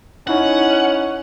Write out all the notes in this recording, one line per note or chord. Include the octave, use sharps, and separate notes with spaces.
C#4 D#4 E4 C#5 F#5